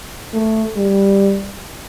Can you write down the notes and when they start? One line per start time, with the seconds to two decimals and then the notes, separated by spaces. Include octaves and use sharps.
0.34 A3
0.76 G3